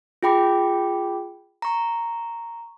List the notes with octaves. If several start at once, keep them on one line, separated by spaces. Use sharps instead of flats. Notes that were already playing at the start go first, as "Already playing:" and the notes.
F4 G#4 G5 B5 D6
A#5 C#6